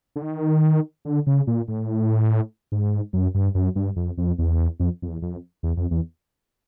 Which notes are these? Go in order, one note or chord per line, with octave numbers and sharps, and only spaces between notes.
D3
D#3
D3
C#3
A#2
A2
G#2
F#2
G2
F#2
G2
F2
F2
E2
F2
F2
E2
F2
E2
F2
E2